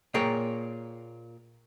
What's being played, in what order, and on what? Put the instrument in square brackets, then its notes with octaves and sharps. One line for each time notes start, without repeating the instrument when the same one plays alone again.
[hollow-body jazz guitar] A#2 G#4 A#4 C#5 G5